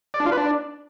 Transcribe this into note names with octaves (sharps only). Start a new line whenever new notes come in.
D5
D4
F4
B4
D4